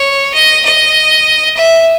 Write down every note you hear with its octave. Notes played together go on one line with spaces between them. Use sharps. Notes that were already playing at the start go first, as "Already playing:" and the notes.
Already playing: C#5
D#5
D#5
E5